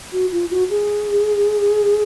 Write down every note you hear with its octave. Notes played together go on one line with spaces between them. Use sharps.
F#4
F4
F#4
G#4